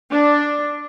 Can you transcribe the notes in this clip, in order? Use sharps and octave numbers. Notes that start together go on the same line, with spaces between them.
D4